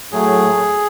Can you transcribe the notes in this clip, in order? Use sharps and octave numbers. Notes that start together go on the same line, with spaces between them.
A2 F#3 A3 G#4